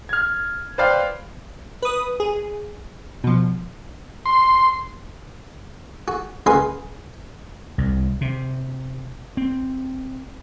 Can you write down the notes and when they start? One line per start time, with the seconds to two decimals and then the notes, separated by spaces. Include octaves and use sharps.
0.09 F6 G#6
0.78 B4 C5 D5 F5 G5
1.82 B4 D#6
2.20 G#4
3.24 B2 F3
4.26 C6
6.08 F#4
6.46 C#2 G#4 B4 F5 C6
7.78 C2
8.21 C3
9.37 C4